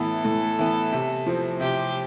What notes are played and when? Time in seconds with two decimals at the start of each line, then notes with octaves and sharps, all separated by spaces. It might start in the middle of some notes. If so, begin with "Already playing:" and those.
Already playing: A2 E3 B3 A4
0.24 A2
0.59 E3 B3
0.92 C3
1.26 F3 C4
1.61 C3 G4